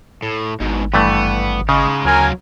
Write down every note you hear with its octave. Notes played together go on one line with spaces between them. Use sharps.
A2
G#1 G#2 B2
G2 E3 A3 B3
C#3 G#3 D#4
D2 F#3 F4 A#4 G#5